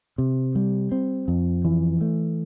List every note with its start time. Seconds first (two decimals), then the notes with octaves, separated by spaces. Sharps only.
0.18 C3
0.55 G3
0.92 C4
1.28 F2
1.65 E3
2.01 A3